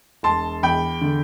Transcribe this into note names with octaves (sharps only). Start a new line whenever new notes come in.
E1 A5 C6
E2 G5 B5
D3